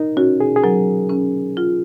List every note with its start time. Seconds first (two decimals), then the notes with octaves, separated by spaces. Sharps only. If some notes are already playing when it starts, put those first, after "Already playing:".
Already playing: D#4 A#4
0.17 C#4 F#4
0.40 G#4
0.56 G#4
0.64 F#3 A#4
1.09 C#4
1.57 F4